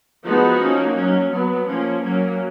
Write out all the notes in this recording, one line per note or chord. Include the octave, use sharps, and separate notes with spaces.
F3 G#3 B3 D#4 F#4
F3 A#3 C#4
F#3 C#4
F#3 B3
F3 A#3 C#4
F#3 A#3 C#4